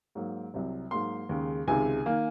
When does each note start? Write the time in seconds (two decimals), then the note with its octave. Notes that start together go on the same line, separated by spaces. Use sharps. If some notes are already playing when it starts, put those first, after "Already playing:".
0.15 G#2 F#3 A#3
0.54 C2 C3 F#3
0.91 G#2 F#3 A#3 C6
1.29 D#2 C#3 G#3
1.67 C#2 C3 D#3 G#3 G#5
2.06 D#3 A#3